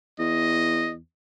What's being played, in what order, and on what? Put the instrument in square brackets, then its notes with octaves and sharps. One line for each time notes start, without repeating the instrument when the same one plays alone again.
[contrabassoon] E2 [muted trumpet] D#5